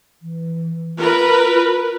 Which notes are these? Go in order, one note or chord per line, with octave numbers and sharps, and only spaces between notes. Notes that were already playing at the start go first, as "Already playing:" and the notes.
E3
F4 A#4 B4